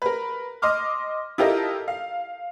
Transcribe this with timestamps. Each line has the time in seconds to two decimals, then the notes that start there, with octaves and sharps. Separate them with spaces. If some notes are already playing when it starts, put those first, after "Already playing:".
0.02 A#4 B4
0.62 D#5 C6 D6 F6
1.38 E4 F4 G4 A4 A#4 D#5
1.88 F5